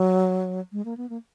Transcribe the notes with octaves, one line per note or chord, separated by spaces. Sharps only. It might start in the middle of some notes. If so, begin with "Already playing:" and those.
Already playing: F#3
G#3
A#3
B3
A#3